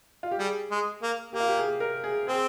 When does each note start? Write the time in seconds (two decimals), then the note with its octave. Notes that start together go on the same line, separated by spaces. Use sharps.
0.23 F4
0.31 G4
0.39 G3 G#4
0.71 G#3
1.02 A#3
1.33 A#3 G4
1.40 F4
1.48 G4
1.57 G#4
1.80 A#4
2.04 G#4
2.27 C4 G#4